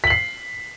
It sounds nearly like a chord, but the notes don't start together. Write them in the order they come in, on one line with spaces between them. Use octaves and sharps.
B6 F#7 C7